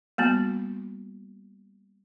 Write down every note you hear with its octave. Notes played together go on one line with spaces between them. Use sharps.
G3 A#3 B3 F#4